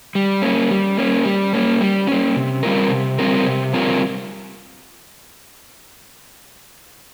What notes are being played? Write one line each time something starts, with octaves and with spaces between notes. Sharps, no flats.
G3
A#3 C#4
G3
A#3 C#4
G3
A#3 C#4
G3
A#3 C#4
C3
G3 C4 F4 A#4
C3
G3 C4 F4 A#4
C3
G3 C4 F4 A#4